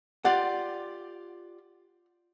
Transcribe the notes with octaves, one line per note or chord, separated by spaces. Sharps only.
F4 G4 D5 F#5